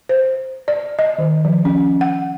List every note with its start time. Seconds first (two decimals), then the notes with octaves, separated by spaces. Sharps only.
0.09 C5
0.68 D5
0.99 D#5
1.18 D#3
1.45 F3
1.65 C#4
2.01 F#5